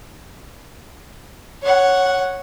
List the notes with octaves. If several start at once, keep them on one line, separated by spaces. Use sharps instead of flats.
C#5 F#5